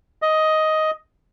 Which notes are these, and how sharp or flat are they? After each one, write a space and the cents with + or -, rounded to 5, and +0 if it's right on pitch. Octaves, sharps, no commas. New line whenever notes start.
D#5 +10